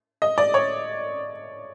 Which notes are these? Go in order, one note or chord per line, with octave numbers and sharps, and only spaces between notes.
D#5
D5
C#5